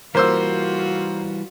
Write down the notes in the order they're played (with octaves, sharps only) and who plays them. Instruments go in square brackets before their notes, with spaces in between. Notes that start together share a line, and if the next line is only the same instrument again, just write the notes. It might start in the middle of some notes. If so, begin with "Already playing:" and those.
[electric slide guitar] E3 G3 [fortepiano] A#3 C5 E6 [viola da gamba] F4 F#4